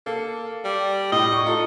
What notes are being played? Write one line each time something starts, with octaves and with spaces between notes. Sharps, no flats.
A#3 A4
G3
A2 D#5
C#6
D#4 F4 A4